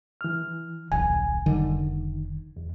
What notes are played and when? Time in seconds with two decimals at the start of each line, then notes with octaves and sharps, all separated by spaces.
0.21 E3 F6
0.92 D1 A#1 G#5
1.46 F1 D3 D#3 G3
2.56 E2